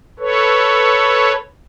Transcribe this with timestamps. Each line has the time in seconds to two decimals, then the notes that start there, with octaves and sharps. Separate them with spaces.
0.19 A4 B4 C#5